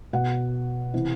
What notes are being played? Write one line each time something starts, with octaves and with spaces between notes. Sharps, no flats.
B2 F#5
C3 E3